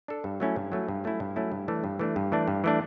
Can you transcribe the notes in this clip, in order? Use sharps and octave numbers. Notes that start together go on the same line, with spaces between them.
D4 A4
G2
F#3 A3 C#4 E4
G2
F#3 A3 C#4 E4
G2
F#3 A3 C#4 E4
G2
F#3 A3 C#4 E4
G2
E3 A3 D4
G2
E3 A3 D4
G2
E3 A3 D4
G2
E3 A3 D4